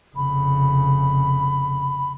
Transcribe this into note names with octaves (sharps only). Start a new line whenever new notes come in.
F1 C#3 B5